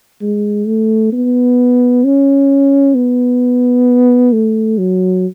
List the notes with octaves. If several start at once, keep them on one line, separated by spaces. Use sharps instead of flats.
G#3
A3
B3
C#4
B3
A3
F#3